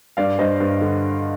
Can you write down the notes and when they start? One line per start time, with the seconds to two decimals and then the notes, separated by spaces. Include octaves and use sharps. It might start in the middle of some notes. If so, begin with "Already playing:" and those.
0.17 G2 D5 F5
0.39 G2 C5 D#5
0.60 G2
0.81 D3